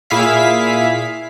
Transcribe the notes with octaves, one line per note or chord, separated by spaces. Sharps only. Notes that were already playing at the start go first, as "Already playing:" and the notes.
A#2 E4 G#4 E5 F5 B6